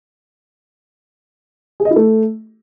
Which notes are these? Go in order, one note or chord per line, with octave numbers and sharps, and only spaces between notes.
G#4
D#5
E4
A3